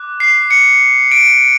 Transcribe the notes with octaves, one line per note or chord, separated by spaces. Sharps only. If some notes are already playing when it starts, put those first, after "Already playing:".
Already playing: D6 F#6
C7
C#7
D7